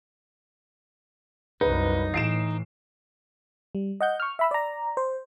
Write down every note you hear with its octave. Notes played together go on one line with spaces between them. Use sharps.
C2 F#2 D#4 B4
A2 E3 C7 D7 E7
G3
D#5 F#5 G6
C#6 F6
E5 B5 E6
D5 A#5
C5